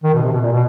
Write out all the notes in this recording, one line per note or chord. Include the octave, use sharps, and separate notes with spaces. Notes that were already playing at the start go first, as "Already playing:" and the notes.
D#3
B2
C3
B2
A#2
B2